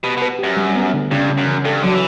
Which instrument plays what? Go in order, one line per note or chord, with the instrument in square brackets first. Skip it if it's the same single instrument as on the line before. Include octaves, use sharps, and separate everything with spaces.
[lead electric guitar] B2 [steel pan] G4
[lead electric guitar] B2
[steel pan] B4
[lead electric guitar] F#2 [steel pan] G4
[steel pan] G3
B3
D3
[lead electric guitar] G2 [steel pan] C#3
[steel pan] C#3
[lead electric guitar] F#2
[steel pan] E3
[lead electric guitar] G2 [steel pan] A4
[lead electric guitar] D3 [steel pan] F#3
[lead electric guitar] E3